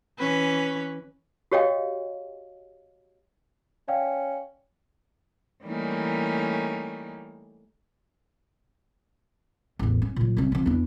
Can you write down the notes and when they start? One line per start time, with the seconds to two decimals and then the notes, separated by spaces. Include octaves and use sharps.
0.19 E3 C#4 B4
1.52 F#4 G4 C#5 D#5 F5 G5
3.88 C#4 D5 F5 G5
5.64 E3 G3 A3 A#3 C#4 D#4
9.79 A1 E2
10.02 C#4
10.16 A#2 F#3
10.37 C2 C#4
10.52 F3 C4
10.66 E2 D4